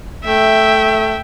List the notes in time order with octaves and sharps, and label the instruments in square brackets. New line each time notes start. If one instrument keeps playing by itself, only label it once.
[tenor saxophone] A3 [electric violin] E5 G5